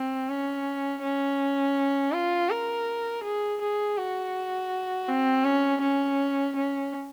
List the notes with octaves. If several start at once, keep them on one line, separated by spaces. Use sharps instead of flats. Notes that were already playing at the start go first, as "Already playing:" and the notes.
Already playing: C4
C#4
C#4
F4
A#4
G#4
G#4
F#4
C4
C#4
C#4
C#4